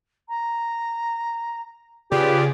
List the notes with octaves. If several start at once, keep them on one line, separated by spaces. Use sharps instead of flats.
A#5
C#3 F4 G4 G#4 B4 D5